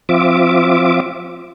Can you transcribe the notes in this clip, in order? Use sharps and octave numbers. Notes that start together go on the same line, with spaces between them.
F3 C4 F4 E5 D6